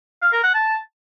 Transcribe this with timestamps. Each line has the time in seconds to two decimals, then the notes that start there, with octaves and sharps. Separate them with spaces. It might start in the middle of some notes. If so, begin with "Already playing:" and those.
0.22 F5
0.33 A#4
0.43 F#5
0.54 A5